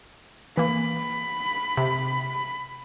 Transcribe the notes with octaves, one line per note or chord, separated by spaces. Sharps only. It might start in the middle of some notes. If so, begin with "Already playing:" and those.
E3 A#3 B5
C3